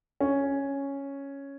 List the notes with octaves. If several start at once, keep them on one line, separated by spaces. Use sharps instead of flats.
C#4